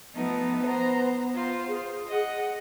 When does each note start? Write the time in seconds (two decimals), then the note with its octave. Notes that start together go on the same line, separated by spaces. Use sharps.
0.15 F3 A3 B3 D#4
0.66 C5 A#5
1.34 F4 C5
1.68 G#4
2.07 D#5 F#5